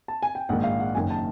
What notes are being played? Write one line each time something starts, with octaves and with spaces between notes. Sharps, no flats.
A5
G#5
G5
A#1 G#2 D#3 F#5
F5
F#5
F#1 F#2 D#3 G#5
A5